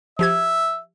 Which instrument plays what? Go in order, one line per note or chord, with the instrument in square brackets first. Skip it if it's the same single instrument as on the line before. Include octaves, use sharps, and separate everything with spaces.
[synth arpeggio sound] F3 G4 G#6 [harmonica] E5